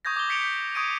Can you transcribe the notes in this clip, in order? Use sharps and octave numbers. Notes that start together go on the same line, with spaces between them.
C#6 D#6 G6 G#6 A#6
D6 G7
G6 B6 C#7 D7 F7 G7
G6 B6
C#6 D#6 G6 G#6 D7 D#7